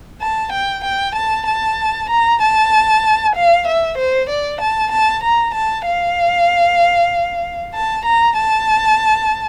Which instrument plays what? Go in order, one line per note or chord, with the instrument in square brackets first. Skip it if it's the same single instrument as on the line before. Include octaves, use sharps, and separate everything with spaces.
[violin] A5
G5
G5
A5
A5
A#5
A5
F5
E5
C5
D5
A5
A5
A#5
A5
F5
A5
A#5
A5